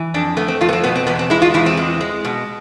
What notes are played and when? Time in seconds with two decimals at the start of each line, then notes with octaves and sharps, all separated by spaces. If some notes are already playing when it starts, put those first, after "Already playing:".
Already playing: E3
0.14 F2 D4
0.37 A3 B3
0.48 C4
0.61 F2 F4
0.69 B3
0.73 C4
0.84 B2 B3
0.96 C4
1.07 E2 B3
1.19 C4
1.30 G#3 E4
1.42 F4
1.54 E2 E4
1.66 C4
1.77 G#3
2.01 G#3
2.25 B2